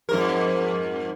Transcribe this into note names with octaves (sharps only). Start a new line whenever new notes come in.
F2 G#2 A#4